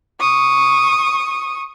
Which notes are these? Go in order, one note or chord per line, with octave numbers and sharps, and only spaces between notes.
C#6 D#6